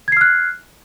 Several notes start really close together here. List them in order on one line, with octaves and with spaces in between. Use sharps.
G#6 C7 F6 F#6